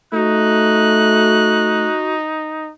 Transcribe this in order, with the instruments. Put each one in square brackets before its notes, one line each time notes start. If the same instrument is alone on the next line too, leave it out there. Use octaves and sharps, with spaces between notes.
[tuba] A3 [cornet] D#4 [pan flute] F#4 [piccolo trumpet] F#6